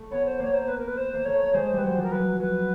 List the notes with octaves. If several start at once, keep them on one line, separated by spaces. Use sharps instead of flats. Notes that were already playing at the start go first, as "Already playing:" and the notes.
Already playing: A3
B3 C#5
C5
A#3 C#5
C5
B4
A#4
B4
C5
A#3
A3 C#5
G#3 C5
G3 B4
F#3 C5
F3
A#4
F#3 B4
F#3 B4